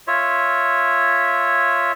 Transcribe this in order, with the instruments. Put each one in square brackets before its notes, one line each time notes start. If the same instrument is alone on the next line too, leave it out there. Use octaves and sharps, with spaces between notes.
[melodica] F4 C#5 E5